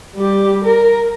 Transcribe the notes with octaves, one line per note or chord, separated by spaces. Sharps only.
G3 G4
A#4